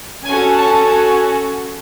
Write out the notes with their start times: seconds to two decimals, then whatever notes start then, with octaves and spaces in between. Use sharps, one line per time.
0.24 C#4 F#4 A4 G#5
0.57 A5
0.91 G#5